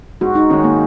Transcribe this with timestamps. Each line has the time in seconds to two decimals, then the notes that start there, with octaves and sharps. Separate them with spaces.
0.21 G#2 F#4
0.35 D#4
0.50 D#3 G#3 C#4
0.64 A#3